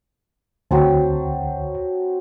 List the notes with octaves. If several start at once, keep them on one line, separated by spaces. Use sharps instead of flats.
D2 F#3 C4 A5